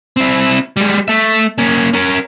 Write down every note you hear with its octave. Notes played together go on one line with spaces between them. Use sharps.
C4 E4
G3 G#3
A3 E5
A#3 C#4
C#4 A#4